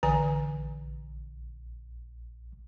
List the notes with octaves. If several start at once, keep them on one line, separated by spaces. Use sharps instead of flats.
A#1 D3 E3 G#5